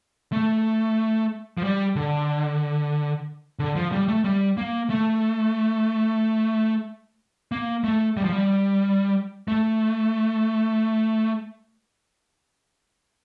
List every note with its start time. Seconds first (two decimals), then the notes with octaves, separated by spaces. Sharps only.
0.32 A3
1.58 F3
1.63 G3
1.96 D3
3.59 D3
3.76 F3
3.92 G3
4.08 A3
4.24 G3
4.57 A#3
4.90 A3
7.52 A#3
7.84 A3
8.17 G3
8.24 F3
8.32 G3
9.48 A3